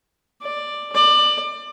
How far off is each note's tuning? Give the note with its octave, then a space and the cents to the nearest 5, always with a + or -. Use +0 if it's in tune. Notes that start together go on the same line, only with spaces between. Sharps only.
D5 +10
D5 +25